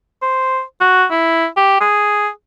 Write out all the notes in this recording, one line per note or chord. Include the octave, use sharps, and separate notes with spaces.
C5
F#4
E4
G4
G#4